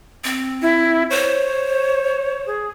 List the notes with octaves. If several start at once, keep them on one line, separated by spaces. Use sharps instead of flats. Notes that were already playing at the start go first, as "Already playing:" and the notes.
C4
E4
C5 C#5
G#4